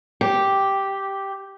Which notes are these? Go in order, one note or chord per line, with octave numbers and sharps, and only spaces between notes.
G4